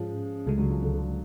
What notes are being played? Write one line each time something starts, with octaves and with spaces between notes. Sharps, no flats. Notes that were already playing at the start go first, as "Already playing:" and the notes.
Already playing: G#2 F3 G#3 C#4
C#2 C#3 F#3 G#3 A3
D3 F#3
F3
D3
D3